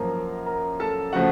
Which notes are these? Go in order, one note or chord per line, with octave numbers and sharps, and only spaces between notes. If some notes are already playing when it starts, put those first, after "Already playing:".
Already playing: F#2 F3 A#3 A#4 A#5
A#4 A#5
A4 A5
C#3 F3 A3 F#4 F#5